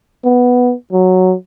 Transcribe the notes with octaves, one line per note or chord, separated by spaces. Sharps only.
B3
F#3